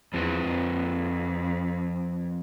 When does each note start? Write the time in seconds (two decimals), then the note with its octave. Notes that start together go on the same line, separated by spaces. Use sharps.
0.13 E2 F3 C4 F4 B4
0.47 F2